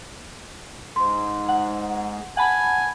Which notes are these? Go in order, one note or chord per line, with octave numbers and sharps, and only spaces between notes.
G#2 C6
F#5
F#5 G#5 A5 B5